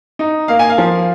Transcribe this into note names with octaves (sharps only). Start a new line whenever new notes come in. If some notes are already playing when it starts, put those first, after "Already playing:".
D#4
A#3 F5
G#5
F5
F3